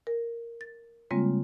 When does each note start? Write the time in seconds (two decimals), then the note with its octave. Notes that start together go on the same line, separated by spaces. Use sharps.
0.07 A#4
0.61 A6
1.11 C#3 G3 G#3 A#3 C4 F4